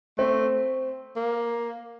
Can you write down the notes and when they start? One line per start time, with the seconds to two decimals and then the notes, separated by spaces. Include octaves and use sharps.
0.18 A3 C4
1.16 A#3